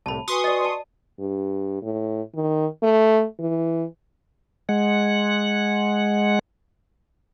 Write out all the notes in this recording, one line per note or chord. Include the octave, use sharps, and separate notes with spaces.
C2 A2 A5 B5
F#4 B4 G#5 C6 C#6 D#6
D5 D#5
D5 A5
G2
A2
D#3
A3
E3
G#3 F#5